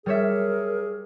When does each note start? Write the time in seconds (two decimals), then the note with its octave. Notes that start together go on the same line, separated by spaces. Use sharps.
0.06 G3 G#4 A#4 C#5 E5